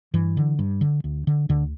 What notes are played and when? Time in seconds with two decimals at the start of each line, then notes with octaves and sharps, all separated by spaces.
0.14 G2 E3
0.37 D3
0.59 G2
0.81 D3
1.04 D2
1.27 D3
1.49 D2 D3